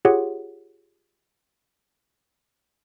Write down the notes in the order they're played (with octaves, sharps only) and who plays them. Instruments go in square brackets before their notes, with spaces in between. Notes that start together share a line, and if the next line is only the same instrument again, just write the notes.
[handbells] F4 G4 G#4 C#5 F#5